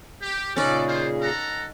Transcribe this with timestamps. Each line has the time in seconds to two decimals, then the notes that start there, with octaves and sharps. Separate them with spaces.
0.22 G4
0.56 A#2 C#3 C#4 D#4 G#4 A4 B4 D5
0.88 A#3 F4 C5
1.22 A4 F#5 A#5